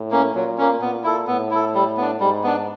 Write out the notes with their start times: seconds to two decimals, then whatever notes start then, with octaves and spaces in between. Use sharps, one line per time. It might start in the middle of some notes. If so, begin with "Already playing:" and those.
Already playing: A2
0.11 A#3 C#4
0.34 A#2 F#3
0.58 A#3 C#4
0.80 A#2 B3
1.04 E4 A4
1.27 A2 B3
1.51 E4 A4
1.74 G3
1.97 B3 D4
2.20 G#2 G3
2.43 B3 D4